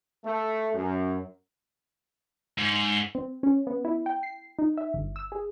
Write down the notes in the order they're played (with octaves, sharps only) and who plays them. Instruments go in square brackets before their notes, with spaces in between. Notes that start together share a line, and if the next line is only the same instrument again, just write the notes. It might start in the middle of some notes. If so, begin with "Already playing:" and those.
[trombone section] A3
F#2
[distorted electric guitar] G#2
[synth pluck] C4
C#4
B3
E4
G5
C7
D#4
E5
G1
E6
G#4